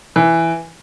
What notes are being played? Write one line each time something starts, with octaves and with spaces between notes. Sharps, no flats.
E3